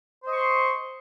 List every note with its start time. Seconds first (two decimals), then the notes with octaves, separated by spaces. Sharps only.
0.23 C5
0.27 D#5
0.31 C#6
0.35 C6